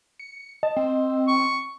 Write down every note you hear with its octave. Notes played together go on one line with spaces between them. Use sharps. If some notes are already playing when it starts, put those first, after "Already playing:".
C#7
D#5 A5
C4
C#6